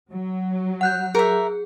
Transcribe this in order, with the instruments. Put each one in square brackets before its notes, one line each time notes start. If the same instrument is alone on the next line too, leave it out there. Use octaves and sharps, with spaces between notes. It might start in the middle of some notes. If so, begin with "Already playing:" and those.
[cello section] F#3
[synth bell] F#5 F#6 G6
[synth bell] G#4 [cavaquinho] A#4 E5